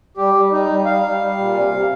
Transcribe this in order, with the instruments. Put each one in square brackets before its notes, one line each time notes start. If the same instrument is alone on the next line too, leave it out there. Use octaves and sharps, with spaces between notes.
[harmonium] G3 G4
G3
G3 D#4
G3
G3 F5
G3
G3
A#2
C3
C3